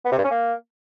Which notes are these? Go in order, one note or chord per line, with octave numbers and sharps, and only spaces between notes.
B3
C3
G2
C#4
A#3